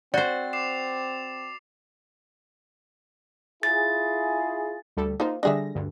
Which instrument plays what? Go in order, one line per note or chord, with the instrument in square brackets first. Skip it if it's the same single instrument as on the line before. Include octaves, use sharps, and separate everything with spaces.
[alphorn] C4 [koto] F#4 C5 [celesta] D5 [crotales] A6
[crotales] D6 C7 E7
[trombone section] E4 F4 G#4 [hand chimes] A6
[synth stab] D2 G3 A4
[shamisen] A#3 F4 C5 [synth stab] D#4
[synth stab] D3 G3 A#6 [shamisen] D4 G#4 E5
[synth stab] D2 G2